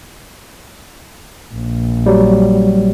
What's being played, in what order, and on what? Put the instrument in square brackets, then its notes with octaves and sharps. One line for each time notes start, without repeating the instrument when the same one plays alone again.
[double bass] A#1
[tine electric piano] F#3 G3